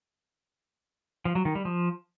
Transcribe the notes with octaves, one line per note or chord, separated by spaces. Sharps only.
F3
F#3
D#3
G3
F3